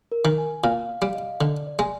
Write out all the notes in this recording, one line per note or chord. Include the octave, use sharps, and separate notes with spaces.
A#4
D#3
G#5
A#2 F5
F5
G3 F5
D#5
D3 D5
D5
G#3